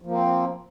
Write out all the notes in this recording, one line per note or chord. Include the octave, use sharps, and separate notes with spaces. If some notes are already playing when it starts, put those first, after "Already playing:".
F3 A#3 C4